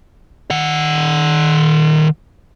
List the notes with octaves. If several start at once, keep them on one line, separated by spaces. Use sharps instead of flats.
D#3 F#5